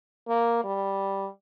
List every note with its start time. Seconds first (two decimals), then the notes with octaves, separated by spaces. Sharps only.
0.28 A#3
0.64 G3